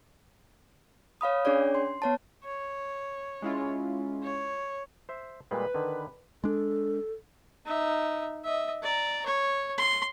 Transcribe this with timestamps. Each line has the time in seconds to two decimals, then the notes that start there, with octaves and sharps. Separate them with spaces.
1.21 C#5 F5 B5 D#6
1.45 C#4 D4 G#4 C#5 D5
1.75 C6
2.02 B3 C#5 A5
2.45 C#5
3.42 G#3 C#4 E4 F4
4.23 C#5
5.09 C5 E5
5.51 A#2 G3 G#3 B4
5.74 D3 D#3
6.44 G#3 D4 A4
7.66 D#4 E5
8.44 D#5 E5
8.82 D5 A#5
9.26 C#5
9.78 C6